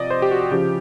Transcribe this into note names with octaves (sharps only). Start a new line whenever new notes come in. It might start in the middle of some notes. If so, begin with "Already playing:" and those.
Already playing: C3 F3 D5 D#5
C5
G4
F#4
C#3 F3 G4